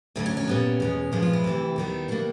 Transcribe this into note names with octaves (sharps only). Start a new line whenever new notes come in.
D2 D3 F#3 E4
C#4
C#4
A#2 G3 B3
E2 B2 G#3
A#2 F3 G#3 B3 D4
F4
E4
D2 C3 E3 G3
D#2 D#3 G3 B3
B2 G3 A#3 D4